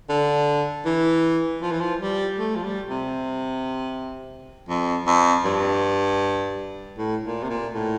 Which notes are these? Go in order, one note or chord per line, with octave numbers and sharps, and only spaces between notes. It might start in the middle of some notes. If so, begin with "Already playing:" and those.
D3
E3
F3
E3
F3
G3
A3
F3
G3
C3
F2
F2
G2
A2
A#2
C3
A#2
A2